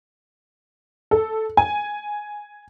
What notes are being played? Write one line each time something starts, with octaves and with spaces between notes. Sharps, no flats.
A4
G#5